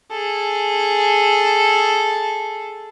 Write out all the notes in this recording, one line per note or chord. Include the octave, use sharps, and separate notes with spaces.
G#4 A4